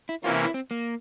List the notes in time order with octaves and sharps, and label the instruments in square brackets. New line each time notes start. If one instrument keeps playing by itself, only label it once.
[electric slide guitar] E4
[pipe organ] C3 E3 A#3 C#4 [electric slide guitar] F4
[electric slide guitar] E4
E4
C4
A#3